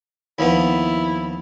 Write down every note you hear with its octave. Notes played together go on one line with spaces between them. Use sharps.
D#2 F3 B3 E4